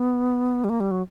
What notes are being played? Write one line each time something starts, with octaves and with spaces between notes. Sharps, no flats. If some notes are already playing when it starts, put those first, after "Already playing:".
Already playing: B3
G3
A#3
G3
F#3